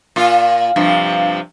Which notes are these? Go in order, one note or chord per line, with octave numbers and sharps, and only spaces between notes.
A#2 F4
G2 C3 F3